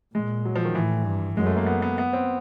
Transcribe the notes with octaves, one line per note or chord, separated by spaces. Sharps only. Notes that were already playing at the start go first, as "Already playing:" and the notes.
A#2 G#3
F#3
F3
D#3
A2 E3
G2
F#2 G#3
A3
A#3
B3
B3
B3
C4